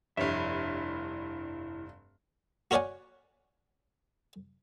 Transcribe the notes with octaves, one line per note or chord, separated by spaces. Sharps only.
F1 G2 E4 C#5 E5
F#4 A#4 C#5 D5 F#5 G#5